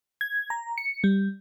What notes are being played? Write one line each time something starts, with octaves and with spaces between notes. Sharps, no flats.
G#6
A#5
C#7
G3